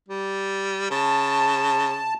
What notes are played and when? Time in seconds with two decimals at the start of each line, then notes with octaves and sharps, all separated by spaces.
0.08 G3
0.91 C#3 A5